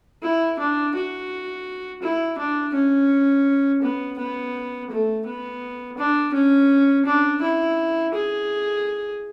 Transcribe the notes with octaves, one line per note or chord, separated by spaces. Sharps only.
E4
D4
F#4
E4
D4
C#4
B3
B3
A3
B3
D4
C#4
D4
E4
G#4